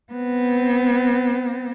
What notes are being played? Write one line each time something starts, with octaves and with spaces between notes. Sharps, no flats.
B3 C4